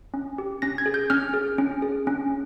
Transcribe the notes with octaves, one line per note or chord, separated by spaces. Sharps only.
C#4
G4
C#4 A#6
G#6
G#4
G6
C#4 F6
G#4
C#4
G#4
C#4